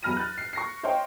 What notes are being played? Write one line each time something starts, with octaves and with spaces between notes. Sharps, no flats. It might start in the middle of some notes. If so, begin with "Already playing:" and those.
E2 F#3 B5 F6 A#6 D#7
F#6 A6
C7
C#6 A#6 C7
C5 C#5 D#5 F5 G5 C#6